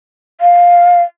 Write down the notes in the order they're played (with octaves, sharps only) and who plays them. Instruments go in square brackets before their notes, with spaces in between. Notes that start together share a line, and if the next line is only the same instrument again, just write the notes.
[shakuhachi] F5